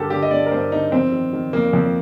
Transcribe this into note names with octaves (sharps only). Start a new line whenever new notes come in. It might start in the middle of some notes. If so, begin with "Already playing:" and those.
Already playing: G2 D3 G4 A4 A#4
D3 G4
D#5
G2 D5
A#4
G2 C5
D3 D#4
F2 C4
D#3
D#3
F2 A#3
F2